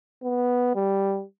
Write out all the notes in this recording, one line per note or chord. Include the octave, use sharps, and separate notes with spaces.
B3
G3